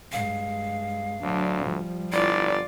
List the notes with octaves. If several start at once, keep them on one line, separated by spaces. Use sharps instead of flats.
G2 G#3 F5
D2 F#3 D4
F3 G3
G1 E4 F4 D5